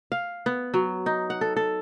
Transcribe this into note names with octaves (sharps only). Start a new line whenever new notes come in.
F5
B3
F#3
D#4
F#5
A4
A4